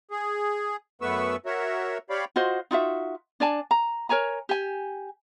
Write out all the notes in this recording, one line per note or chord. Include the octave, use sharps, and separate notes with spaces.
G#4
F#2 A3 B3 B4 C#6 E6
F#4 A#4 C#5 E5
G4 C#5 D5 F5 B5
F4 F#4 C5 D#5
D#4 F4 F#4 E5
D4 D5 G#5 A5
A#5
A#4 C#5 G#5 A#5
G4 G#5